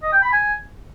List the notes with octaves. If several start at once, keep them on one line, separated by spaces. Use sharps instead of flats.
D#5
G5
B5
G#5